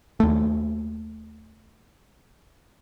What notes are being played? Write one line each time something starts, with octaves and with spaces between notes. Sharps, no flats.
D#2 A3